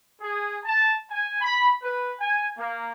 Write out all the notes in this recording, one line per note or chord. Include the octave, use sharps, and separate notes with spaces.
G#4
A5
G#5
B5
B4
G#5
A#3